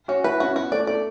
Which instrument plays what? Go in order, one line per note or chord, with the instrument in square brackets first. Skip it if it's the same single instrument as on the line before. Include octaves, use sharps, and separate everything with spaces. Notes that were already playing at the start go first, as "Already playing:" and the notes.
[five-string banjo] C#4 [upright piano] F#4
[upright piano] E4 [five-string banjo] B4
[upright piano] C#4 [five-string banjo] F#4
[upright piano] B3 [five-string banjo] F#4
[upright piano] A3 [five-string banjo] D5
[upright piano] A3 [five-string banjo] D5